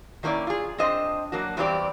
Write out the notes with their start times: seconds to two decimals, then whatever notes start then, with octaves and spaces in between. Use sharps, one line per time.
0.23 D#3 F#3 A#3 C#4 E4 D5
0.47 F4 G#4
0.78 C4 D4 C5 D#5
1.32 F#3 A#3 D4 F#4
1.57 E2 G2 C4 G4 D5